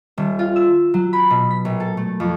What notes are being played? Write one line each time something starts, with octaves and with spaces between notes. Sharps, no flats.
D#1
F4
E6
F#3
B5
B2
B6
A#1
A4
A3
F2